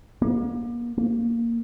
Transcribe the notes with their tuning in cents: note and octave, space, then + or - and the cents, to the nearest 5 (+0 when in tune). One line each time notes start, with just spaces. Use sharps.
A#3 +35
A#3 -5